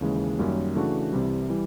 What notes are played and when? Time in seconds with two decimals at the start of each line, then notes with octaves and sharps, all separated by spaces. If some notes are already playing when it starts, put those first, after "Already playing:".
0.01 D#2 C#3 E3 G#3
0.39 F#2 D#3 G3 A#3 C#4
0.76 C#3 E3 A3 D4 F#4
1.13 C2 C3 E3 G3
1.49 E3 G3